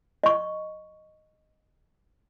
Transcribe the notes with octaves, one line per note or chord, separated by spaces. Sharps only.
D#5 C#6